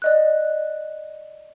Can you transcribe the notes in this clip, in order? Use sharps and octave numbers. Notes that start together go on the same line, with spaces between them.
D5 D#5 F#6